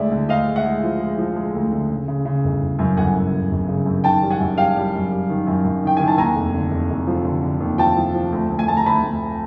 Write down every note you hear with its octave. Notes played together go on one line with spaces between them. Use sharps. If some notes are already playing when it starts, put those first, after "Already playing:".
Already playing: D2 G#3 D5 E5
D3
D2 D#5 F5
G#3
E5 F#5
G#3
F3
G#3
F3
G#3
D2
D3
C#3
C#3
C#3
G1
G1
F#2
G1 F#5 G#5
F#2
G1
G1
C#3
F#2
D#3 G5 A5
G3
F#5 G#5
F#2
G3 F5 G5
G3
F#2
G3
D#3
F#2
F#2
D#3 G5
D#3 G#5
A5
D#2 G#5 A#5
F1
D3
F1
F1
F3
D3
D3
D#2
F3 G5 A5
F3
F3
D2
D2
G#5
D2 A5
A#5
D2 A5 B5
D2